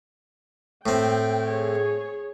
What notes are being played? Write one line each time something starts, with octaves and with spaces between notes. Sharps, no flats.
A2 C4 G5
G#4 C#5